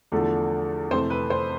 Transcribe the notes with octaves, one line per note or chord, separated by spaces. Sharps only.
E2 D3 F3 A3
F2 C3 E3 A3 C5
B4
C5